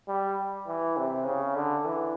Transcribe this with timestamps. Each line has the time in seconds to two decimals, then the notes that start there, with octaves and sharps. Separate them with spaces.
0.08 G3
0.68 E3
0.97 C3
1.26 C#3
1.56 D3
1.85 E3